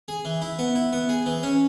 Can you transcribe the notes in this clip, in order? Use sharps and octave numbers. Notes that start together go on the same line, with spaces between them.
G#4
E3
E4
B3
E4
B3
G#4
E3
C#4